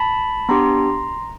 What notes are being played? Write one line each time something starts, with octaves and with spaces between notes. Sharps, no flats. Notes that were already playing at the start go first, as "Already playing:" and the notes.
Already playing: A5 B5
B3 D4 G4 A#5 C6